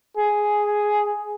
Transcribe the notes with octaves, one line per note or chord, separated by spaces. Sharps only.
G#4